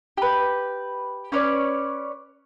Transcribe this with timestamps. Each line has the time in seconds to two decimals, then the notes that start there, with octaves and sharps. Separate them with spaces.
0.17 G4 B4
1.32 C#4 B4 C#5 D5